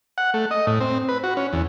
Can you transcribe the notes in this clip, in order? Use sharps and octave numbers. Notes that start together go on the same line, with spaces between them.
F#5
A3
D#5
A2
C4
B4
F#4
C#4
E2